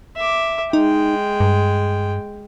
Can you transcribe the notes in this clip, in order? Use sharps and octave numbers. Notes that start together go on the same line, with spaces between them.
E5 D6
G#3 D#4 G5
G2